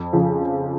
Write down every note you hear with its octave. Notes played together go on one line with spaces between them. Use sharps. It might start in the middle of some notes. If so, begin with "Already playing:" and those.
Already playing: F2
C#3 F3